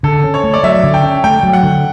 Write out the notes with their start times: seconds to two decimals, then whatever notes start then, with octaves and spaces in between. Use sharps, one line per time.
0.03 D3 A4
0.24 C#4
0.34 C#5
0.44 A3
0.54 D5
0.63 F#3 E5
0.83 D3
0.94 G5
1.04 C#4
1.24 A3 G5
1.43 F#3
1.53 F#5
1.63 D3